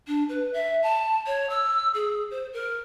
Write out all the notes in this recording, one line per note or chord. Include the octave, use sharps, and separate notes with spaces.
D4
B4
E5
A5
C#5
E6
G#4
C5
A#4